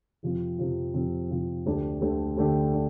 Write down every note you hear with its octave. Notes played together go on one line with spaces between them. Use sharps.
F2 C3 F3 C4 F4
F2 C3 F3 C4 F4
F2 C3 F3 C4 F4
F2 C3 F3 C4 F4
D2 D3 A3 D4 G4
D2 D3 A3 D4 G4
D2 D3 A3 D4 G4
D3